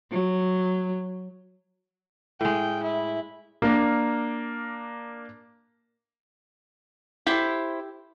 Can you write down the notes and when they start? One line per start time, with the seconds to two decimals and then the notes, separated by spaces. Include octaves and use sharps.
0.11 F#3
2.41 A2 G#3 G5
2.83 E4
3.62 A#3 D4 A#4
7.27 E4 G4 A4 C5